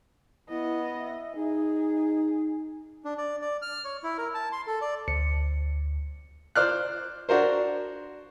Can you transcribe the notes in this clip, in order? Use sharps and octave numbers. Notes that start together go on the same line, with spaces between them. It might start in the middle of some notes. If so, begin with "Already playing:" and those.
B3 E4 D#5
E5
D#4 G#4
D4
D5
D5
F6
C#5
E4
A#4
A5
C6
A4
D5
D2 C#7
C5 D5 F6 F#6
D4 F#4 A#4 C5